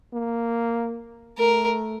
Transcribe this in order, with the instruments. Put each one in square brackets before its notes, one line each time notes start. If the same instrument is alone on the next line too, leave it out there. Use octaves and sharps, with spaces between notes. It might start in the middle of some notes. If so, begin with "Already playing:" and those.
[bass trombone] A#3
[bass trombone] A3 [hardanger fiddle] A#4